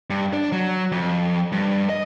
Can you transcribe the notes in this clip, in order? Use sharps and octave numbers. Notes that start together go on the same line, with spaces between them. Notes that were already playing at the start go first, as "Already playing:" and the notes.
G2
D4
F#3
F2
G2
D#5